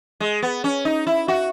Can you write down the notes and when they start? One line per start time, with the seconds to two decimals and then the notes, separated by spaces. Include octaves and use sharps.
0.20 G#3
0.42 B3
0.64 C#4
0.85 D#4
1.07 E4
1.28 F#4